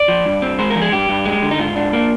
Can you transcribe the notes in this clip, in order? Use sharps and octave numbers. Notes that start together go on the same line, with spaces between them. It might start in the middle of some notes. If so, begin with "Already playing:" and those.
Already playing: D5
F3
G2
C4
G#3 C5
A#4
F3
G#4
G2 G4
G2
G#3
D3
D#4
G#2 F4
D4
A#3